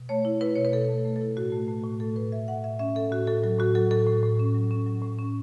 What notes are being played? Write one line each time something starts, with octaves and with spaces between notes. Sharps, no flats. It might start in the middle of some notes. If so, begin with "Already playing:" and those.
Already playing: B2
A3 C#5
E4
E4 B4
B2 C#5
B4
B2 A4
A3
A3
A4
E4
A2 F#4
A3
A3
A2
A3 A4
A2 B4
A2 E5
A2 F#5
A2 E5
C#4 E5
C#4 A4
A2 F#4
A2 A4
F#3 A4
A2 F#4
F#3 A4
A2 A4
A2
A2
C#4
F#3
C#4
F#3
A2
C#4